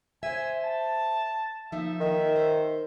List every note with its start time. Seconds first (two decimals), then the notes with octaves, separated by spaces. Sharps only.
0.23 C5 E5 G#5
0.64 A5
1.72 F3 A#3 D#4 E5
2.00 D#3
2.36 C5